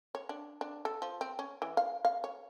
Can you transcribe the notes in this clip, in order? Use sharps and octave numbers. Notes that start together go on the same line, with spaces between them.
C#5
D4
D4
A4
F3
C4
C#4
E3
F5
F5
C#5